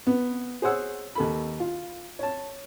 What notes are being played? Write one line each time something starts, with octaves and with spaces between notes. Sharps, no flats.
B3
G#4 C5 C#5 F#5 E6
D#2 A4 B5
F4
C#5 A5